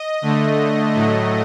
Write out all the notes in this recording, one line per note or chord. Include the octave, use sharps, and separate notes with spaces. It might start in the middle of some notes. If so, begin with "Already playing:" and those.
Already playing: D#5
D3 A3
A2 F#3 A3